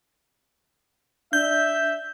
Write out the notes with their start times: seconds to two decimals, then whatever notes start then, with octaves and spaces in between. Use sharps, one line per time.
1.33 D4 E5 G6